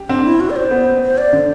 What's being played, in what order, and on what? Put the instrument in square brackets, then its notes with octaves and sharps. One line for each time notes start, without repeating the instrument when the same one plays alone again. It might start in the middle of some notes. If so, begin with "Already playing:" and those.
Already playing: [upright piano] G4
[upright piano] C4 [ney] D4
[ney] E4
F#4
D5
C5
[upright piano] B3
[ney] C5
D5
[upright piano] D3